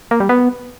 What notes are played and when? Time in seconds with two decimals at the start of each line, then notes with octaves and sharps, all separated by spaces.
0.11 A#3
0.20 G3
0.29 B3